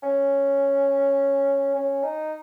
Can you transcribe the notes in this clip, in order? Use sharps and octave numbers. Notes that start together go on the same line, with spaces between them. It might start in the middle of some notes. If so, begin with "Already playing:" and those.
C#4
C#4
D#4